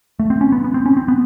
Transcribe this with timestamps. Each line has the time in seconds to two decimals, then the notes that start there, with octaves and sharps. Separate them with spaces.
0.20 A3
0.30 C4
0.41 C#4
0.52 B3
0.64 B3
0.74 C4
0.86 C#4
0.97 C4
1.08 B3